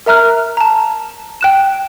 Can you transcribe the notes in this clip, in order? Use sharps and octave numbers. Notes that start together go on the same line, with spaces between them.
A#4 E5 A#5 F6 F#6
A5 A#5
G5 F#6 E7